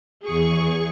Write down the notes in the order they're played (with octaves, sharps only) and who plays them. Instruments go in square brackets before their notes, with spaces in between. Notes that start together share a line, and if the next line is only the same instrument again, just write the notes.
[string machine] E2 C#6 [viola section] G#4